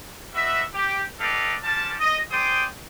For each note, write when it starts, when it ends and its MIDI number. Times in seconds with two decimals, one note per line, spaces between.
0.34 0.62 66
0.34 0.62 71
0.34 0.62 75
0.34 0.62 76
0.74 1.03 67
1.19 1.56 67
1.19 1.56 69
1.19 1.56 71
1.19 1.56 74
1.19 1.56 75
1.19 1.56 77
1.63 1.94 61
1.63 1.94 65
1.63 1.94 67
1.63 1.94 81
2.00 2.20 75
2.32 2.65 68
2.32 2.65 72
2.32 2.65 74
2.32 2.65 79
2.32 2.65 84
2.32 2.65 87